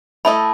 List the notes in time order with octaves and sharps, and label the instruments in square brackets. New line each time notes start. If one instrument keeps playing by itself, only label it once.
[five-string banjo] A3 E4 A4 D#5 [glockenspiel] B5